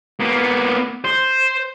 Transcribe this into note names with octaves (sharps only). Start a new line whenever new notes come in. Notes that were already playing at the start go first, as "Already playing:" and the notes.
A#3 B3
C5